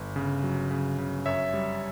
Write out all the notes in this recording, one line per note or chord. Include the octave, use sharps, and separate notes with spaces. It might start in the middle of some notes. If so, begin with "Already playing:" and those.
Already playing: G1
C#3
F#3
C#3
C#3
F#2 C#5 E5
G3